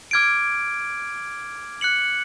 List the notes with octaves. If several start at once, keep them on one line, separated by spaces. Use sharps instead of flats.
D6 F6 G#6 D7
F#6 C#7 F#7